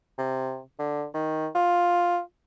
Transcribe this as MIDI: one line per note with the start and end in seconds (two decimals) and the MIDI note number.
0.18 0.60 48
0.79 1.05 50
1.14 1.47 51
1.55 2.20 65